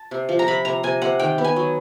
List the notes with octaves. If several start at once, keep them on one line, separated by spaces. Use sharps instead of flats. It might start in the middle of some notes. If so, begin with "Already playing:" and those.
Already playing: A5
C3
F3
A#5
C3 B5
C3 A#5
C3 G#5
C3 F#5
D#3 G5
B3
G#5
F#3